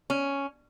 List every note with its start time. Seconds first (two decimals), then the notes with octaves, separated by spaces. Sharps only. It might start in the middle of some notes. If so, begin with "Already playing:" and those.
0.10 C#4